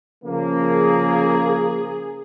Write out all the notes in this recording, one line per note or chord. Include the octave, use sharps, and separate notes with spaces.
C#3 F3 A#3
G#4